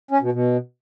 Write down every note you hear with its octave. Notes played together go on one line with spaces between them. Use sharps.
C#4
B2
B2